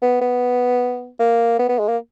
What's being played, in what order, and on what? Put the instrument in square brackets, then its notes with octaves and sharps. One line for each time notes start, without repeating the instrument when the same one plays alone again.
[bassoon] B3
B3
A#3
B3
B3
G#3
A#3